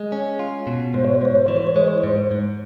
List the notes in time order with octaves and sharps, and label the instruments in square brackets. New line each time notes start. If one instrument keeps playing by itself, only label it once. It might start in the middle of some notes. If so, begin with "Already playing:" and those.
Already playing: [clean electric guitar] G#3
C#4
F4
B2
[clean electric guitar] G#2 [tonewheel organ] C5
[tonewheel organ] C#5
C5
[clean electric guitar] G#2 [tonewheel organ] C#5
[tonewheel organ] C5
[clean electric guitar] E3 [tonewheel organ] C#5
[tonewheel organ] C5
C#5
[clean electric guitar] G#3 [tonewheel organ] C5
[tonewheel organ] C#5
C5
[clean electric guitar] G#2
G#2